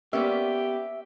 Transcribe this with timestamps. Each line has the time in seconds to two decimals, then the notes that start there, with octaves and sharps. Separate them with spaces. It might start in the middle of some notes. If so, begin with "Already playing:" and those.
0.13 A#3 B3 C#4 G4 C5 D5 E5